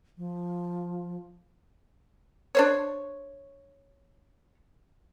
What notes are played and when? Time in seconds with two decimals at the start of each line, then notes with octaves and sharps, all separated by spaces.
0.18 F3
2.55 D4 C5 C#5